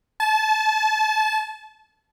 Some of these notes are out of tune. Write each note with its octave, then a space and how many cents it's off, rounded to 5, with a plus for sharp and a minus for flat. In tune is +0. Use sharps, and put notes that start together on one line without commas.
A5 -30